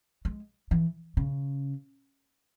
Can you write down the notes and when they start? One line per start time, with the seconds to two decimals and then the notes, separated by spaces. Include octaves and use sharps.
0.25 G#3
0.71 E3
1.17 C#3